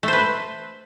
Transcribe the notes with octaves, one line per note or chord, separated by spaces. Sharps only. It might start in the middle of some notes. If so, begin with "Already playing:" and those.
A3 B4 C5